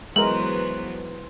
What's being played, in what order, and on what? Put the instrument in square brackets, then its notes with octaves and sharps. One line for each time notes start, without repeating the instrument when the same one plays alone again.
[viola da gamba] E3 F#3 B3 [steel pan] G#3 A#4 [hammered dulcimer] C5 [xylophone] F#7